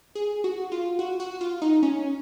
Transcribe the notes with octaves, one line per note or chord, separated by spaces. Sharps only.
G#4
F#4
F4
F#4
F#4
F4
D#4
C#4